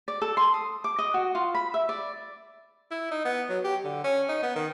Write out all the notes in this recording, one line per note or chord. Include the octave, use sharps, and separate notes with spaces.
D5
A4
C6
D#6
D6
D#5
F#4
F4
B5
E5
D5
E4
D#4
B3
F#3
G4
D3
C#4
D#4
B3
D#3